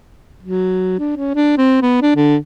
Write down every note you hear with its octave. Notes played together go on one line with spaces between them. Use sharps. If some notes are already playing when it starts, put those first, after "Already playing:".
F#3
D4
C#4
D4
C4
B3
D4
D3